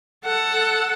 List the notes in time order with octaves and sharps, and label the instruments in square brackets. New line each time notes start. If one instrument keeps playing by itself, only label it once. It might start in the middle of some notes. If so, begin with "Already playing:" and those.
[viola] A4 F#5